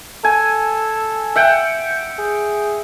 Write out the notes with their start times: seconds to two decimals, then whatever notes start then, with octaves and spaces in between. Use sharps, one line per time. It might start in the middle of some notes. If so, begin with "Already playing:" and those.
0.24 A4 G#5
1.36 E5 F#5 G5
2.19 G#4